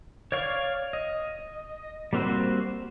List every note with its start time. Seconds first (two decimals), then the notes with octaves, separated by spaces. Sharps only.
0.32 C#5 D5 F5 C#6
0.93 D#5
2.13 G3 A#3 C4 F#4 C5